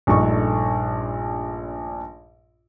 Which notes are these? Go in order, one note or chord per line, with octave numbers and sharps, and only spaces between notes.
A#1 G2 A3 D#4 A4 C#6